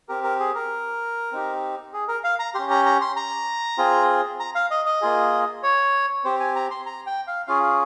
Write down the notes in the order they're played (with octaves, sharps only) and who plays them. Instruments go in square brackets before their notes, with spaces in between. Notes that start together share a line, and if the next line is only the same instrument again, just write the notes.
[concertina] C4 G4 A#4
A#4
G#4
A#4
C4 D#4 G4
G#4
A#4
F5
A#5
C#4 G4 C6
A#5
A#5
C6
A#5
C4 F4 G#4
A#5
F5
D#5
D#5
A#3 F4 G#4
C#5
C4 G4 C5
G#5
A#5
C6
A#5
G5
F5
C#4 F4 G#4 F5
F5